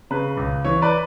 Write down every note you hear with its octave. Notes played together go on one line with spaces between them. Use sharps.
C#3 B4
C#2
E3 C#5
B4 D5